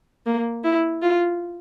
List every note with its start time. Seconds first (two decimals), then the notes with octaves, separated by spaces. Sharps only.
0.26 A#3
0.64 E4
1.02 F4